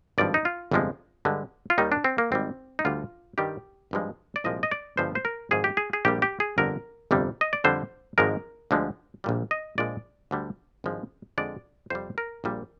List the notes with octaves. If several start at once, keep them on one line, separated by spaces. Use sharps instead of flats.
G#1 G2 F3 D5
D#4
F4
G1 F2 C3 F3 G#3
G2 D3 G#3
F4
D#2 D#3 G3 D#4
D4
C4
A#3
G#1 G#2 G3 C4
D#4
D2 D3 G3 F4
G2 D#3 G3 G4
G#1 G2 F3 G#3
D5
C2 A#2 F3 G#3 D#5
D#5
D5
G1 G2 F3 G#3 C5
C5
A#4
G#1 G#2 F3 G#4
G4
G#4
G#4
A#1 A#2 G3 G4
G4
G#4
G1 F2 D3 A#4
G1 F2 C3 G3
D#5
D5
F2 D3 G3 C5
G#1 G#2 F3 G#3 A#4
D2 D3 F3 G#3
A#1 A#2 G3
D#5
A#1 A#2 F3 G#3 D5
D2 D3 G3
G#1 G2 F3 G#3
F2 D3 G#3 D5
F2 C3 G3 C5
A#4
A#1 A#2 G3